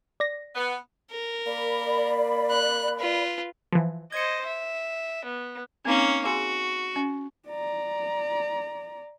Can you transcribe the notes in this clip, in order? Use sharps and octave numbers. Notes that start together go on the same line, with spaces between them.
D5 A#6
B3
A#4
A#3 D5 B5
F#6
F4 B4
E3 F3
C5 D#5 G#6 C#7
E5
B3
A#3 C4 C#4 D#4
F#4 G#4 G#5 C6
C#4
D5 A#5